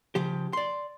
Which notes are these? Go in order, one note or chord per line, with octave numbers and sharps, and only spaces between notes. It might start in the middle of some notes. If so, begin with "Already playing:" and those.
C#3 F3 G4
D5 C6